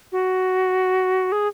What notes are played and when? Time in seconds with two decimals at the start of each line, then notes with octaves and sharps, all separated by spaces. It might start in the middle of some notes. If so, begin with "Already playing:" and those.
0.12 F#4
1.32 G#4